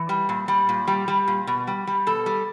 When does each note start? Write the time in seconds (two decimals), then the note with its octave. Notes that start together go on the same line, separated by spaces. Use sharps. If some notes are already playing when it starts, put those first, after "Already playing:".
Already playing: E3
0.09 G3
0.29 A#2
0.48 G3
0.69 A#2
0.88 G3
1.08 G3
1.27 A#2
1.47 B2
1.67 G3
1.87 G3
2.07 B2 A4
2.26 G3